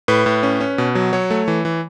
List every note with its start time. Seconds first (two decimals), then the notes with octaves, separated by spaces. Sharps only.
0.08 A2 B4
0.26 A2
0.43 C#4
0.60 C#4
0.78 B2
0.95 F#3
1.13 F#3 C#5
1.31 A3
1.48 E3
1.65 E3